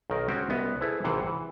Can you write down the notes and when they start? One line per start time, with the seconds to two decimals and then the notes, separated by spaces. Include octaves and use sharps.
0.10 B1 D#3 A#4
0.28 G#3 C4 C#4 F#4 C#5 G5
0.49 C2 B3 D#5
0.80 E4 G#4 A4 B4 C5
1.04 G#1 C3 E3 C5 F#5
1.27 E3